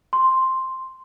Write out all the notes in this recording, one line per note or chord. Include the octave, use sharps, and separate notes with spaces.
C6